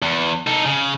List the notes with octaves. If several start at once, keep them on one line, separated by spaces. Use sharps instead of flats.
E2
D#4 A4
C#3